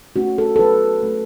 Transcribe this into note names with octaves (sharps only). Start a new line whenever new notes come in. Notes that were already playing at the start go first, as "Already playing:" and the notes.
A3 C#4 F#4
A4
A4
F#3 B4
A3 C#4